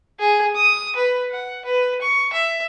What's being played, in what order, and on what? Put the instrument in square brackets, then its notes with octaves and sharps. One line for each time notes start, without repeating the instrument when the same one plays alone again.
[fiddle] G#4
D#6
B4
F#5
B4
C#6
E5